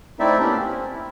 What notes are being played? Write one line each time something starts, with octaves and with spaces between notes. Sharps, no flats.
A3 C4 D#4 E4 D5 E5
A#3 B3 C#4 D4 E4 G4
C4
E4